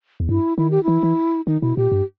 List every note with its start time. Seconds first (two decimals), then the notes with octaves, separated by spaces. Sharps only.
0.20 E2
0.29 G2 E4
0.57 D#3 E4
0.71 G4
0.83 E3 E4
1.03 E3
1.47 D#3 D#4
1.61 B2 E4
1.77 A#2 G4
1.92 G2